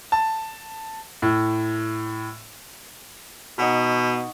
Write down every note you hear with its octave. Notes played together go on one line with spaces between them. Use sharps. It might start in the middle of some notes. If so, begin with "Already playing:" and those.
A5
A2
B2 D#4 F#5 C#6